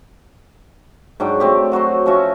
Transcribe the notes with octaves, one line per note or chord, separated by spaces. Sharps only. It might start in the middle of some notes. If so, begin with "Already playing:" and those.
G#2 F#3 D4 G5
A3 C4 G4
F#3 F#4 C5 C6
F3 C#4 F#4 E5